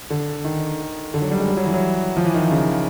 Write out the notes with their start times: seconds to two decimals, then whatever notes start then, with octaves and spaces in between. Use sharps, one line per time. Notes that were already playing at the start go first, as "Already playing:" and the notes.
0.10 D3
0.45 D#3
1.14 D3
1.22 F#3
1.31 G3
1.40 G#3
1.48 G3
1.57 F#3
1.65 E3
1.74 F#3
2.17 F3
2.25 E3
2.34 D#3
2.51 C#3